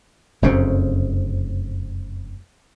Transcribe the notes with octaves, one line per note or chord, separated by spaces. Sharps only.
F1 F#2 C#3 C4